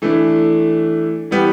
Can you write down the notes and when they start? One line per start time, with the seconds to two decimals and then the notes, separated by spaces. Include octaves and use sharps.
0.02 E3 A3 D4
1.31 E3 G3 B3 G4